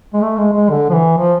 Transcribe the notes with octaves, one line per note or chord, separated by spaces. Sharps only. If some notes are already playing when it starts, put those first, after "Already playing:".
G#3
A3
G#3
G#3
D3
F3
E3
F3